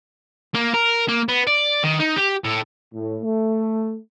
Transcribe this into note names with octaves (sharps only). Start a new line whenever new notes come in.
A#3
A#4
A#3
B3
D5
D#3
D#4
G4
A2
A2
A3